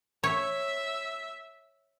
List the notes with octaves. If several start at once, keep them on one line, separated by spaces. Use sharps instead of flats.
C#5 E5